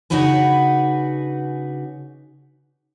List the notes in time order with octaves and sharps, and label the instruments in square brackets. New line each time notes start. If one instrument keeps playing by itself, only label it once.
[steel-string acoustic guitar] C#3 D4 D#4 F#4 B4 G#5